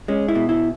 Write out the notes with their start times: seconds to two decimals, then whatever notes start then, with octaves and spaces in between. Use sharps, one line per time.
0.08 G#3 C#4
0.28 E4
0.35 B2
0.49 E4